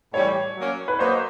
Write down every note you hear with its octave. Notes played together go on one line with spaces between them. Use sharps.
A2 E3 G3 C#5
F#3 A#3 C#4
B4
F#3 A#3 D#4 C5